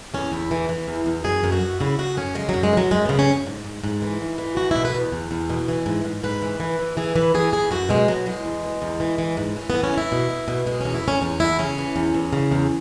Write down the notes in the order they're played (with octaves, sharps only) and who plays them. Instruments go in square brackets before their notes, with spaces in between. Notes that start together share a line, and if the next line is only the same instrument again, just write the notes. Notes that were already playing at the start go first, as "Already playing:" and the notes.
[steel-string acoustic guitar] E2 C#4
E2 E4
E3
E3
E2
E2
F#2 G#4
F#2
F#4
F#2
C#3 E4
C#3 F#4
F#2 C#4
C#3 G#3
F#2 F#3
G#3
E3
F#3
F#2 G#3
C#3 B3
C#4
F#2
G#2
G#2
G#2
E3
G#2
E3
E2 F#4
B2 E4
B4
E2
E2
E2
B2
E3
G#2
G#2
G#2 B4
E3
E3
E3
E3 G#4
E3 B4
E3 G#4
E3 G#4
F#2 F#4
B2 G#3
B2 F#3
E2 G#3
E2
B2
E2
E3
E3
G#2
E3 C#4
E3 B3
C#4
E3 E4
B2
B2
B2
B2 G#3
E2 C#4
E4
E2 C#4
E2 C#4
E2 E4
C#3 C#4
E3
E2
E2
C#3
E2